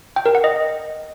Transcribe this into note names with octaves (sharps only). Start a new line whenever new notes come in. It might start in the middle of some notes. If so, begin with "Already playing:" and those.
G5
A#4
F#5
D#5